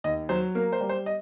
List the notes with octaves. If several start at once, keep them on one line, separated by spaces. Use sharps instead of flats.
D#2 D#5
F#3 C5
A#3 A#4
C5
G3
C5
D#5